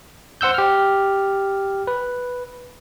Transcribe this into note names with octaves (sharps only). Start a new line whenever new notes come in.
C5 F#5 E6 G6
G4 F6
B4